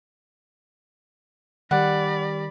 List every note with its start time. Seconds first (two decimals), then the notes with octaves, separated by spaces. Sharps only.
1.71 D#3 G3 D5 F#5 B5